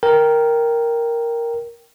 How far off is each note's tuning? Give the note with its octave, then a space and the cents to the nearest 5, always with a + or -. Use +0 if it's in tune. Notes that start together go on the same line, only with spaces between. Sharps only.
A#4 +0 G5 +0